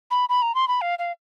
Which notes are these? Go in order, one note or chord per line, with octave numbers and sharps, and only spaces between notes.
B5
B5
A#5
C6
B5
F5
F5